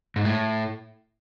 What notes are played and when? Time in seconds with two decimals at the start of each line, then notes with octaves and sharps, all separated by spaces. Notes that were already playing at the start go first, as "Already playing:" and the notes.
0.16 G#2
0.25 A2